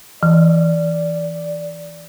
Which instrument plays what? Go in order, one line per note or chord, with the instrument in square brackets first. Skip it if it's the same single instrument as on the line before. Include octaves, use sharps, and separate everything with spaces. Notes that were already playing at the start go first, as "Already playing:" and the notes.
[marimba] E3 [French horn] D5